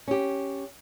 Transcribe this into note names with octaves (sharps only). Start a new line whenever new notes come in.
C#4 G4